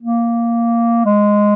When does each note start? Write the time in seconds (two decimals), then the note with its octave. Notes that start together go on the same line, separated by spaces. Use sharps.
0.02 A#3
1.05 G#3